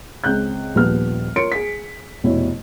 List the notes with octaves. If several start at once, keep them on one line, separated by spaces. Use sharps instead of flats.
C#2 C4 F#6 G6
D#1 A#1 F3 B3 G4 F6
F4 A#4 C#5 C6 C#7 D7
G#4 B6
F1 B2 E4 C#5